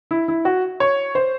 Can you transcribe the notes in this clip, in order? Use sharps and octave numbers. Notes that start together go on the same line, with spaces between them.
E4
E4
F#4
C#5
C5